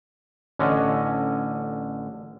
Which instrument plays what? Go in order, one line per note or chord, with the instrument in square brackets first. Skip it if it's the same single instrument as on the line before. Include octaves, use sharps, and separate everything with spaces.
[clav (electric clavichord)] A1 D3 C#4 D#5